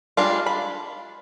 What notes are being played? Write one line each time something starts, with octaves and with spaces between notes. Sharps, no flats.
G3 G#3 D4 F4
B5